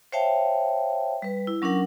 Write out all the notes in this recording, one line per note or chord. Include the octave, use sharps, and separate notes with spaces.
C5 C#5 E5 F5 G5 A5
G3 B4
E4
F#3 C#4 D4 A#4 F#5